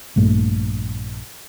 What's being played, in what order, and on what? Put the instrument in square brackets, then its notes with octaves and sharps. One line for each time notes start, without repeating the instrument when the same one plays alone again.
[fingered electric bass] A#1 G2 A#2 A3